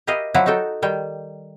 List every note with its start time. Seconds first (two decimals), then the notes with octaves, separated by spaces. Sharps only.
0.07 E4 G4 A#4 D#5 F5
0.34 F3 F#3 E4 F#4
0.46 D#4 F#4 A4 G5
0.82 D#3 G3 G5